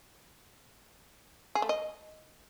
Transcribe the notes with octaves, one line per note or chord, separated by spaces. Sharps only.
G#4
A3
D#5